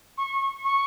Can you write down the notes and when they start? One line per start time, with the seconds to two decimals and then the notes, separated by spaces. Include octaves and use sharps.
0.18 C#6
0.65 C#6